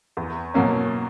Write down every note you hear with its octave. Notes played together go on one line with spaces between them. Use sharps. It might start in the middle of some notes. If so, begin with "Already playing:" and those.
E2
B2 F#3 A#3 C#4